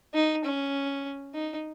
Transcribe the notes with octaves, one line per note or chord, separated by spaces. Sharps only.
D#4
C#4
D#4